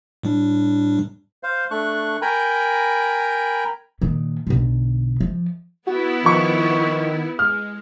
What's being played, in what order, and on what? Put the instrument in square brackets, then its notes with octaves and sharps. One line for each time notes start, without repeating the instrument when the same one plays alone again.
[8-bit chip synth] A2 G3 D4
[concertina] C5 F5
A3 D4 C#6 F#6
A#4 G5 G#5 A#5 B5
[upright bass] A#2 D#3
B1 D3
F3
[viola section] B3 E4 [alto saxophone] F#4
[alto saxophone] D#3 [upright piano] F3 C#6
[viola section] G#3 [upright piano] F6